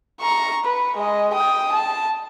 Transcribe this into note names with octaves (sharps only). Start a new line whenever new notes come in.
A#5 C#6
B4
G#3 D#5
G5 D#6
A5